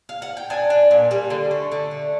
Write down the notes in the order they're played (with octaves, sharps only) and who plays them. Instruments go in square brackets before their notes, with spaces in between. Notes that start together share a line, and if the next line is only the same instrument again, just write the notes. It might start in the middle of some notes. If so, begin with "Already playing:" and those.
[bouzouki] F5
F#5
G5
D4 G#5
D4
A#2
G3
D3
A3
D3
A3